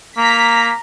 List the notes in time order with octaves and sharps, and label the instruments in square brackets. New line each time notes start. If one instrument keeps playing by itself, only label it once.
[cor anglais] A#3 [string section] A#5 B6